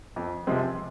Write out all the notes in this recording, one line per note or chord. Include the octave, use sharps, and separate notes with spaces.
F2
C3 F3 G#3 C4